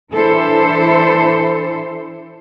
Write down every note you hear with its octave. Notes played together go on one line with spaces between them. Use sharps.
E3 D4 E4 A4 C5